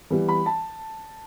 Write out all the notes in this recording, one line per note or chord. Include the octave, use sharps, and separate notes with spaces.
E3 G3 B3
B5
A5